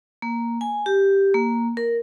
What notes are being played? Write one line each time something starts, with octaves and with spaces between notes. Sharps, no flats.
A#3
G#5
G4
A#3
A#4